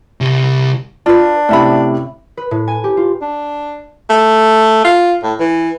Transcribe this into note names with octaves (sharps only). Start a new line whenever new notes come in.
C2
D4 F4 B4
A2 C3 C#4 E5 B5
B4
A2
G#5
G4
F4
D4
A3
F4
A2
E3